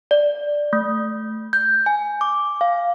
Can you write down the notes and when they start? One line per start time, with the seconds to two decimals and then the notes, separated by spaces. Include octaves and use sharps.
0.11 D5
0.73 A3
1.53 G6
1.86 G#5
2.21 D6
2.61 F5